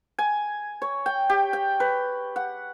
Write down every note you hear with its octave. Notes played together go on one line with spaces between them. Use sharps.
G#5
C#5
G5
G4
G5
B4
F#5